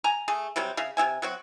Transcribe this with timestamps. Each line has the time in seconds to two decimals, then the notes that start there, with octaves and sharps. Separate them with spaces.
0.04 G#5 A#5
0.28 A3 G#4
0.56 C3 F#3 G3 C4
0.77 C#3 E5 F5
0.97 C3 E4 E5 G#5
1.22 F#3 C4 F#4